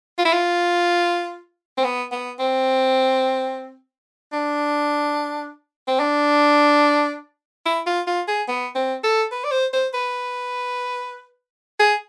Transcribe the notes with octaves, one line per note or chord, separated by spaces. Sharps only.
F4
E4
F4
C4
B3
B3
C4
D4
C4
D4
E4
F4
F4
G#4
B3
C4
A4
B4
D5
C5
C5
B4
G#4